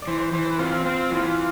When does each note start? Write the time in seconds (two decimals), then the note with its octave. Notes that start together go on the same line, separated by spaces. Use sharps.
0.02 D5
0.07 E3 C5
0.21 C5
0.33 E3 C5
0.46 B4
0.59 C4 F4
0.85 C4
1.11 E3